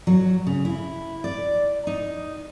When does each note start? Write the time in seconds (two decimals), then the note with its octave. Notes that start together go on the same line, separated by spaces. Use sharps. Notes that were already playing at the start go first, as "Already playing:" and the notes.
0.07 F#3
0.47 C#3
0.65 E4
1.24 D5
1.87 D#4